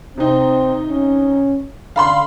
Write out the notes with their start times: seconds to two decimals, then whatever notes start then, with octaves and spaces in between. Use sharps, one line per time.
0.18 C3 C4 D#4
0.89 C#4
1.96 D3 F5 B5 C6